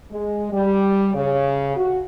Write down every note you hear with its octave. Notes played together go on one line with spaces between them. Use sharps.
G#3
G3
C#3
F#4